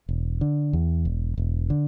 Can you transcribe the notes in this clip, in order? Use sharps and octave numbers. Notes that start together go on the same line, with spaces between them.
E1
D3
E2
E1
E1
D3